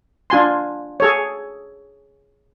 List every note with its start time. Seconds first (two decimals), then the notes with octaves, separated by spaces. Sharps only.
0.30 D4 F4 G#5 C6
1.00 G#4 A4 C#5